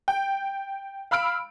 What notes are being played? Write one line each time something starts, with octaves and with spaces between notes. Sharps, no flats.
G5
F5 B5 E6 F6 D7